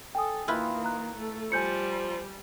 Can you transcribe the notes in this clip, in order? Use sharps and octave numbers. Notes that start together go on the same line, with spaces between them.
A4 G5 G#5 D#6
D#3 A#3 E4 F4 B4
A#5 F#6
A3 A4
F3 G3 G#5 G6 C#7